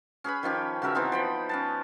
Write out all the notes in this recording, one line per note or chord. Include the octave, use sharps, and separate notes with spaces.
C#4 G#4 B4 B5
D#3 F3 C#4 G4
C#3 F#4 A#4 E5
E3 B3 C4 D#4
F3 G5 B5
C#4 B4 A5